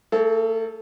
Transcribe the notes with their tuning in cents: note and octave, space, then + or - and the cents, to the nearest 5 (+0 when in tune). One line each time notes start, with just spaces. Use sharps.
A3 +35 A4 -30